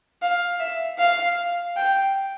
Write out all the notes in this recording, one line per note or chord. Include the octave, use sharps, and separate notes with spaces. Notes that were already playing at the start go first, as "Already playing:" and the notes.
F5
E5
F5
G5